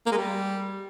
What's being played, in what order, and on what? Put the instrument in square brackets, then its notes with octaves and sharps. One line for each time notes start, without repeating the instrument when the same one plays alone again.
[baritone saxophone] A#3
G#3
G3